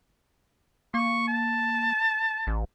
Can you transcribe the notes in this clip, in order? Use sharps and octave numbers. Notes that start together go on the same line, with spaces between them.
A#3 C#6
A5
A1